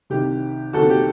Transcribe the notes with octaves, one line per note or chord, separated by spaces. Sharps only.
C2 C3 D#3 G4
C2 C3 D#3 F#4 A4
G4